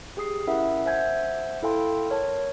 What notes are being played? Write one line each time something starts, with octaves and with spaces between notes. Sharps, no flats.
G4 G#4 D#6 C7
C#4 E4 A#4 E5 F#5
C5 E5 F#5 G#5 G6 G#6
E4 A4 F5 G5 C6
A#4 C#5 A5